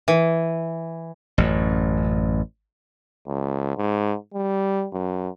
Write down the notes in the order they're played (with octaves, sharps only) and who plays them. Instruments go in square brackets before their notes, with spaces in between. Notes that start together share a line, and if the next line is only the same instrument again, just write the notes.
[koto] E3
[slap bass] A1 F#2
[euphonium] C#2
G#2
G3
F#2